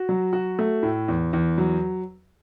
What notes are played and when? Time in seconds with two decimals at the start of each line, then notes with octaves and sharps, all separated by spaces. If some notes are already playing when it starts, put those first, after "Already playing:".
Already playing: F#4
0.09 F#3
0.33 F#4
0.59 A3
0.83 A2
1.08 E2
1.33 E2
1.58 F#3